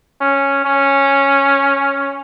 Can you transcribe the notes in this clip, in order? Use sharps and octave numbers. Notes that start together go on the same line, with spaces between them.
C#4
C#4